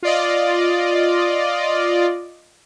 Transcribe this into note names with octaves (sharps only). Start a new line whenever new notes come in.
F4 D5 D#5